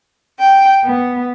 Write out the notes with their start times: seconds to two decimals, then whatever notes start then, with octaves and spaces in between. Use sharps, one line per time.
0.39 G5
0.85 B3